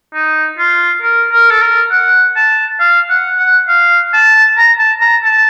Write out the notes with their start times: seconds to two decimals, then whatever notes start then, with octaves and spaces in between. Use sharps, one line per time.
0.14 D#4
0.58 F4
1.02 A#4
1.33 A#4
1.51 A4
1.62 A#4
1.91 F#5
2.36 A5
2.80 F5
3.10 F#5
3.38 F#5
3.68 F5
4.13 A5
4.58 A#5
4.79 A5
5.01 A#5
5.24 A5